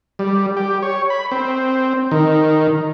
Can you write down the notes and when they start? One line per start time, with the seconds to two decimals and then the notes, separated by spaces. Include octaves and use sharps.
0.19 G3
0.57 G4
0.83 C#5
1.10 B5
1.32 C4
2.11 D#3